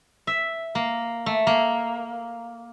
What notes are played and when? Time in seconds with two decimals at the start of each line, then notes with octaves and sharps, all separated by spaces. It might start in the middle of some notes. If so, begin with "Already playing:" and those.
0.27 E5
0.75 A#3
1.26 A3
1.47 A#3